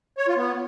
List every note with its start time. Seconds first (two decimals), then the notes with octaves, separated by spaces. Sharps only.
0.18 C#5
0.27 F4
0.37 B3